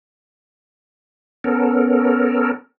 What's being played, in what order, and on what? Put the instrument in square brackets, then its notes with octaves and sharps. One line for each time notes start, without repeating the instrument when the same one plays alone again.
[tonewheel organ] B3 C#4 A4 A#4